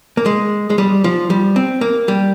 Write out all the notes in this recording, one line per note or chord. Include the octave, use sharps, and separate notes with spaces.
A#3
G#3
G#3
G3
F3
G3
C4
A#3
G3